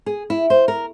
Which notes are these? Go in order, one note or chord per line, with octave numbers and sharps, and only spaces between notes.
G#4
E4
C5
A#4